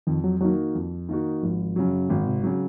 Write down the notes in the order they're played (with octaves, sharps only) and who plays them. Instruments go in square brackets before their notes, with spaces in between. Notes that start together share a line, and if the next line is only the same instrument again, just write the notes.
[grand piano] F2 [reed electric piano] D#3
[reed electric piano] F#3
[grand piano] D#3 A#3 D#4 F#4 [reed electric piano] F#3
[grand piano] F2
D#3 A#3 D#4 F#4
[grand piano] G#1 [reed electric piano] F3
[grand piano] F#2 C#3 F#3
[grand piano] G#1 [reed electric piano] D#3
[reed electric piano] C3
[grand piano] C#3 F#3